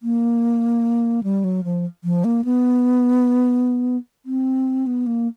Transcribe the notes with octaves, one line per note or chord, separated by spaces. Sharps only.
A#3
G3
F#3
F3
F3
A#3
B3
C4
B3
A#3